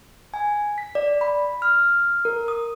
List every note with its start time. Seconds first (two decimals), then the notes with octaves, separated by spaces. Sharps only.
0.34 G#5
0.78 B6
0.95 D5
1.21 B5
1.62 F6
2.25 A#4
2.48 D#6